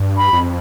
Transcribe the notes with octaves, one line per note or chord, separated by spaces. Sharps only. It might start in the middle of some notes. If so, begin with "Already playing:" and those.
Already playing: G2
B5
F2